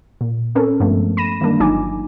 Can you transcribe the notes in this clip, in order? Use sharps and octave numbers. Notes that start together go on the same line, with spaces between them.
A#2
C4 C#4 A4 A#4
G2 F3 G#3 A3 B3
B5 A#6 D#7 E7
D#3 E3 G3 G#3 A#3 D4
G1 F#3 D#4 F4 G#5 D6